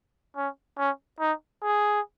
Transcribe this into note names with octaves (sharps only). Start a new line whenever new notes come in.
C#4
C#4
D#4
G#4